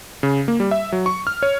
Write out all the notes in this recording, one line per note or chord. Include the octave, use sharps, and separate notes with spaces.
C#3
A#3
G3
E5
F#3
C#6
F6
C#5